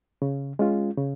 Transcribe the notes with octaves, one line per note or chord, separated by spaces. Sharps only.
C#3
G#3 C#4 F4
C#3